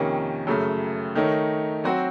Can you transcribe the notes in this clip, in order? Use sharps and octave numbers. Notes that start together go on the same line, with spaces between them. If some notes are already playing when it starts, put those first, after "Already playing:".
Already playing: F2 C3 D#3 A#3 C#4
F#2 C#3 A3
D#3 A3 D#4 A#4 C#5
F#3 C4 F#4 C5